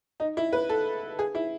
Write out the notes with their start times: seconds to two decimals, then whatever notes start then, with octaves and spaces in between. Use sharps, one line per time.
0.20 D#4
0.37 E4
0.52 B4
0.69 A4
1.19 G#4
1.35 E4